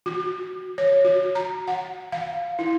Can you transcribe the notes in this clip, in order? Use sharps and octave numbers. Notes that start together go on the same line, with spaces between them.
F#4
C#5
F#4
A#5
F#5
F5
E4